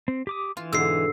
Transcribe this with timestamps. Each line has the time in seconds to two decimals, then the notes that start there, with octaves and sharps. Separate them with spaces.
0.08 C4
0.27 G4 D6 D#6
0.57 E3 F4
0.73 G#2 B2 D3 E6 C7